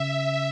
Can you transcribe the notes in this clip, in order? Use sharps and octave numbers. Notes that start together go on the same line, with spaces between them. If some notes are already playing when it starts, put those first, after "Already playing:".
Already playing: C#3 E5